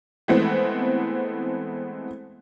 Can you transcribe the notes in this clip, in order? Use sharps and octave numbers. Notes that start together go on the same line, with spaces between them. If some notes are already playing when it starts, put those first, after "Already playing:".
E3 G#3 A3 B3 C4